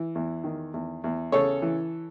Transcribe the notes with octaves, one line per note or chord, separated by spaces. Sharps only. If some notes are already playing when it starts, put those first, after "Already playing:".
Already playing: E3
E2
D#3
E2
E2
C#3 A4 C#5
E3